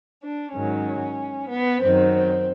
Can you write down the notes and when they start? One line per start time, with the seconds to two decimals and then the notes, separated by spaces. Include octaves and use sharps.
0.22 D4
0.53 G#2 D#3 F#3 C#4
1.49 B3
1.81 F#2 D#3 F#3 C4
2.14 C4